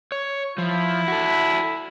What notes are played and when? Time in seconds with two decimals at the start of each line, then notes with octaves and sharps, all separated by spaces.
0.12 C#5
0.58 F3 E4
1.08 F#4 A4